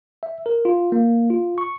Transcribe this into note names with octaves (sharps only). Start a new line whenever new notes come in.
E5
A#4
F4
A#3
F4
C#6